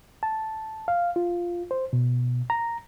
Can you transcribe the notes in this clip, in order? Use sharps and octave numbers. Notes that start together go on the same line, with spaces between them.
A5
F5
F4
C5
B2
A#5